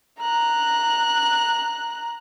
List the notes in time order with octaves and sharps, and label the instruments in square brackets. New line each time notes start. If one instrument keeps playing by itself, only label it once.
[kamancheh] A#5 F#6